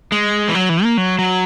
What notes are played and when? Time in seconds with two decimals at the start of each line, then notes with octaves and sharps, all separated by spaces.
0.12 G#3
0.49 E3
0.54 F#3
0.69 E3
0.84 A#3
0.98 F#3
1.19 F#3